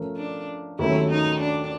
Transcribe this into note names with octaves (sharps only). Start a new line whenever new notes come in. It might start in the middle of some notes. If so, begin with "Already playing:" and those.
Already playing: F3 A3 C#4 A#4
D4
D#2 D#3 F#3 A3 C#4 E4
D#4
D4